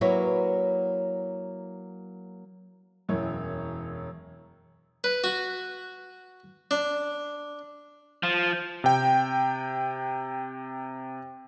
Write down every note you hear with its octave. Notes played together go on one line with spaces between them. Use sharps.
F#3 A#3 E4 B4 C#5
E1 F#2 E3 C#5
B4
F#4
D4
F3
C3 G5